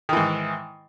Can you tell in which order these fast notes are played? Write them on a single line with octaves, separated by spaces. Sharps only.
D#3 E3 G#2